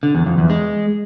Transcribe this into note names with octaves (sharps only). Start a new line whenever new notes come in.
D3
E2
F2
E2
G#3